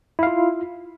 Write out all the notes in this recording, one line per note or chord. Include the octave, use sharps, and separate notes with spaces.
E4 F4 F5